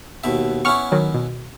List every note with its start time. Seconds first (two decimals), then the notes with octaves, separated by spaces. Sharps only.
0.24 D#2 B2 E5
0.65 B3 C#4 E4 C#6 F6
0.92 D#3 F#3
1.14 B2